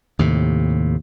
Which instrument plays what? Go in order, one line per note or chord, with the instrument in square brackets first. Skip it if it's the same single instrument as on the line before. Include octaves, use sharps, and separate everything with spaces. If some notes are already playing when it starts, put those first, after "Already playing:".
[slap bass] D#2 A2 C3